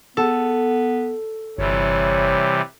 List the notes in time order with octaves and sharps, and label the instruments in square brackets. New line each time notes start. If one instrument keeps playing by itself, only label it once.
[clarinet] B3 [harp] A4
[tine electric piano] G1 [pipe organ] C3 E3 G3 [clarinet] C#5